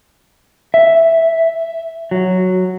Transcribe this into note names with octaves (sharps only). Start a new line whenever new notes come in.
E5
F#3